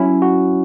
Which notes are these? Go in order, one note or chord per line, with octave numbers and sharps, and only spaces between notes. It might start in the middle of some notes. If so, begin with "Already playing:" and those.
Already playing: F#3 C#4 E4
F#4